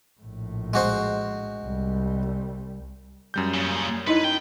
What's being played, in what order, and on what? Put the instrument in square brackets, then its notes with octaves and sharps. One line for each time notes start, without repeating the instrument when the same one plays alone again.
[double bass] A#1 A2
[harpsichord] G#3 F#4 C5
[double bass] C2 G3
[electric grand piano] F#2 G3 G6
[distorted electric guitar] A#2 C#3
[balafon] D#4 E4 D#5 [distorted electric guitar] B4
[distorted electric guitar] G5